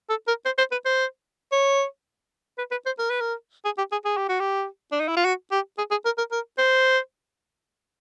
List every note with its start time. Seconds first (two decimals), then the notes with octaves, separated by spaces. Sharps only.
0.10 A4
0.28 A#4
0.46 C5
0.58 C5
0.72 B4
0.85 C5
1.52 C#5
2.58 B4
2.71 B4
2.86 C5
2.99 A#4
3.10 B4
3.21 A#4
3.65 G#4
3.78 G4
3.92 G#4
4.05 G#4
4.17 G4
4.29 F#4
4.40 G4
4.92 D4
5.00 D#4
5.08 E4
5.17 F4
5.25 F#4
5.52 G4
5.78 G#4
5.91 G#4
6.05 A#4
6.18 A#4
6.32 A#4
6.58 C5